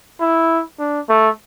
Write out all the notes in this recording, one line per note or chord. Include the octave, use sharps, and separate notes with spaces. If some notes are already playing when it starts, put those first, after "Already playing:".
E4
D4
A3